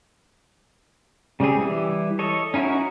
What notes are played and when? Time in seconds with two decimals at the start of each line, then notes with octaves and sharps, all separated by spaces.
1.40 C#3 G3 C4 G#4
1.59 E3 G3 E4
2.19 A4 C#5 D#5
2.54 C#4 D#4 E4 F#4 A#4